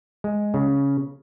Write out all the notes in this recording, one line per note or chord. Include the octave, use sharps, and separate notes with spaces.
G#3
C#3